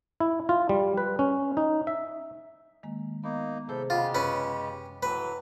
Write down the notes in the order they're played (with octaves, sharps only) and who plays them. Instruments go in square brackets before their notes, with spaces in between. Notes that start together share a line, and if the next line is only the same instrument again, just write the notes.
[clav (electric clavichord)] E4
F4
G3
B4
C#4
D#4
E5
[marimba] D#3 G#3 A#3
[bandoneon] A#3 D#4 [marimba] B3
[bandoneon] A2 A4 G6 [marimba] C3 G#4 C5
[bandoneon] C#3 G#3 G4 [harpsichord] F4 [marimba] F#5 B5
[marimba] F#2 [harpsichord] C#4 B4
[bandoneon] A2 E3 F#3 [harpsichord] B4